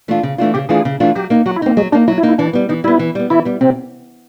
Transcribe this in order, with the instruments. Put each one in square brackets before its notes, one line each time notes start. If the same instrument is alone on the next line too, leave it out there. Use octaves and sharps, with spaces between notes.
[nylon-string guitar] E3 A3 D4 F4
C#3
E3 A3 D4 F4
[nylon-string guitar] C#3 [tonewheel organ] G4
[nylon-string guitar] E3 A3 D4 F4 [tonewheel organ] G#4
[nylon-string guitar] C#3
E3 A3 D4 F4
[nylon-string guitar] F#3 [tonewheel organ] G4
[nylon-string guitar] A#3 D#4
[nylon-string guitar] F#3 [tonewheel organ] F#4
[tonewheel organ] E4
[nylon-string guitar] A#3 D#4 [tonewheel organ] C4
[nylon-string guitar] F#3 [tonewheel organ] G#3
[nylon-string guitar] A#3 D#4 [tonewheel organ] D4
[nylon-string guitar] F#3 [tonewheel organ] E4
[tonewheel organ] E4
[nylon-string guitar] A#3 D#4
[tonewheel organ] E4
[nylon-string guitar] E3 [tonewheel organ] D4
[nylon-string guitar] G3 B3
[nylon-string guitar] E3 [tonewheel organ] D#4
[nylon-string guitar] G3 B3 [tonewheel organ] E4
[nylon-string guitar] E3
G3 B3
[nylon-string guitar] E3 [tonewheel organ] E4
[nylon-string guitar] G3 B3
[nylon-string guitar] C3 [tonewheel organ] C4